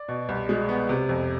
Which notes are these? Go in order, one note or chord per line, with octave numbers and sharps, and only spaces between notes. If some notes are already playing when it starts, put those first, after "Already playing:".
Already playing: D5
B2
C2
G#3
B3
C3
F2